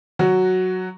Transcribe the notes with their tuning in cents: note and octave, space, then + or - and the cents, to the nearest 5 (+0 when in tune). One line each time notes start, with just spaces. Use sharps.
F#3 +0 F#4 +0